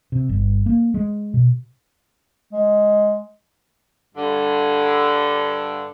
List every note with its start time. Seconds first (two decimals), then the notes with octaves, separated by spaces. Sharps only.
0.12 C3
0.29 G1
0.66 A#3
0.94 G#3
1.34 B2
2.53 G#3
4.15 G2 D3